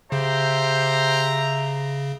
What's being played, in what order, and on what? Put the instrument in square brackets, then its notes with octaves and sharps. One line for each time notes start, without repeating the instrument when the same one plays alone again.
[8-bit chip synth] C#3 [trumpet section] G4 C5 [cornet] E5 [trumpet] A#5